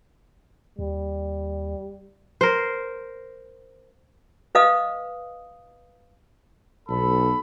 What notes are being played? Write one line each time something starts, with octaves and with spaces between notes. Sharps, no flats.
D#2 G3
A#4 C5
B4 D#5 F5 D#6
B1 A4 B5